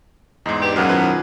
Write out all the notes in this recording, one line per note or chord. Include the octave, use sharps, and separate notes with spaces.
E2 G#2 D#4 C6 D#6
B3 D4 G4
F#2 B2 F#3 A#3 G#4 B4
D#3 F3 E4 B4